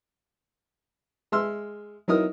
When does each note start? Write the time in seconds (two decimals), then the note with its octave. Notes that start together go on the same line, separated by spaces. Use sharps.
1.32 G#3 E5 C6 E6 F6
2.08 F#3 D#4 E4 A#4 D#6 F6